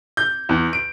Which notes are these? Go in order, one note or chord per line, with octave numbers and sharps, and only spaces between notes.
G6
E2
D7